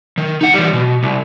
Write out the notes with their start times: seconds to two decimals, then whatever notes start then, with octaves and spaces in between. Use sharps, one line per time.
0.18 D#3
0.41 D#4 F#5
0.54 E3 G3
0.73 B2
1.03 C2